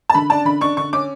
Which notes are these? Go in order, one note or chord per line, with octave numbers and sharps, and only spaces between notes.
A5
D3 B5
D4 A5
D3 B5
D4 C#6
D3 C#6
C#4 D6